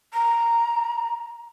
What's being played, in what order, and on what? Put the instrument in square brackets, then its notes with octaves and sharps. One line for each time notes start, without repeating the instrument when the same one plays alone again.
[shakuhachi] A#5